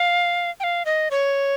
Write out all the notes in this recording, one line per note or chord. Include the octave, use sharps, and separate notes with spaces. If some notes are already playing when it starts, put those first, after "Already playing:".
Already playing: F5
G5
F5
D#5
C#5